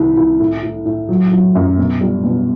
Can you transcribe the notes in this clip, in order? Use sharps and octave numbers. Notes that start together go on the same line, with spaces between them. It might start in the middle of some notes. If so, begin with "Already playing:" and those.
Already playing: C2 D#3
C2
A2
A2
A2
F#3
F#3
F#2
B2
G3
B2